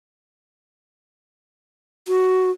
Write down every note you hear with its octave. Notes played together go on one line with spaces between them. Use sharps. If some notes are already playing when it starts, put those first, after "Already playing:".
F#4